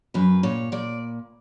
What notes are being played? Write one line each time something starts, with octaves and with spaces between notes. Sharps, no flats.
F#2 B4
A#2 C#5
A#2 D5